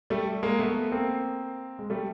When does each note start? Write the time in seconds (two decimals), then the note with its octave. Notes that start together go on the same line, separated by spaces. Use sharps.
0.10 G3 A3
0.43 G#3 A#3
0.59 A3 B3
0.92 A#3 C4
1.79 G#3
1.90 G3 A3